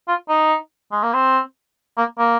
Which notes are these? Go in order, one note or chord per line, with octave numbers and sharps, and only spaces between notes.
F4
D#4
G#3
A#3
C4
A#3
A#3